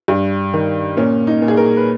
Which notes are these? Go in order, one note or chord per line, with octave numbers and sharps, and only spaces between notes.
G2
D#3
A#2 C#4
D#4
A#2
G#4
A#4
B4